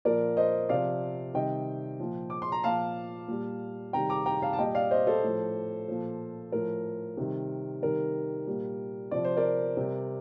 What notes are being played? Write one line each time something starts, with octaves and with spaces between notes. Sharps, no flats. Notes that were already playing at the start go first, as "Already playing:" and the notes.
A#2 F3 A#4 D5
C5 D#5
C3 F3 D5 F5
C3 D#3 G3 D#5 G5
A#2 F3
D6
C6
A#5
A#2 F3 F5 A5
A#2 G3
C3 D#3 G3 G5 A#5
A#5 D6
G5 A#5
F5 A5
A5
A#2 G3 D#5 G5
D5 F5
C5 D#5
A4 C5
A2 F3
A#2 F3
A2 F3 A#4
C3 D#3 G3
C3 D#3 G3 A#4
A#2 G3
C3 F3 D5
C5
A#4 D5
C3 G3